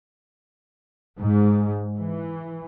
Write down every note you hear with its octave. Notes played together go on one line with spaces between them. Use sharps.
G#2
E3